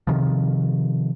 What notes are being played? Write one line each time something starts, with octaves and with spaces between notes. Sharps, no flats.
C3 D#3 F3